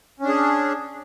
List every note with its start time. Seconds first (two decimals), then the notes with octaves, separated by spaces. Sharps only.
0.20 C#4
0.24 D4
0.28 G#4